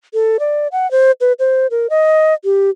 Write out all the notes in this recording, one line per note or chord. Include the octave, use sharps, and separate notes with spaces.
A4
D5
F#5
C5
B4
C5
A#4
D#5
G4